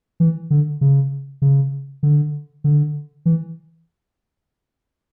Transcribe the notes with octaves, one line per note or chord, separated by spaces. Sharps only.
E3
D3
C#3
C#3
D3
D3
E3